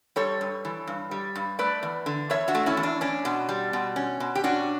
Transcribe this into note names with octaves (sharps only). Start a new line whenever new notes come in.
G3 A4 C#5
G2
E3
G2
G3
G2
A3 B4 D5
E2
D3
E2 C#5 E5
D4 F#4
A3
C#4 E4
E2
D4
C#4 D4
B2
G3
B2
C#4
B2
G4
C#4 D4 F#4